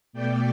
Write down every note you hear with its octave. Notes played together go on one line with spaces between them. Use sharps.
B2 A3 D5 G5